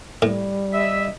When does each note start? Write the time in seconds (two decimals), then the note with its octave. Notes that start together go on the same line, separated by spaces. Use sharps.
0.22 A2 G3
0.72 D#5 E5